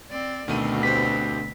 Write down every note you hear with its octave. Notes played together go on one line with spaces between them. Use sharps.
C4 D5
D2 B2 D#3 A3 C4 D#7
G4 B4 C5 B6